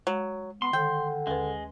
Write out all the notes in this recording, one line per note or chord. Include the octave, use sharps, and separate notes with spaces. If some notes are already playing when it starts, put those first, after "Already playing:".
F#3 G#3
B3 C6
D3 D#3 G5
D#2 G#3 B4